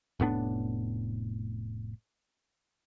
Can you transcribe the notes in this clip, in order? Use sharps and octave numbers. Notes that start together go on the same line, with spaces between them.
F1 A2 B3 D4